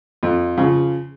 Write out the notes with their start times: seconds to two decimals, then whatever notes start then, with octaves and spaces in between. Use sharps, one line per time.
0.23 F2
0.57 C#3 F3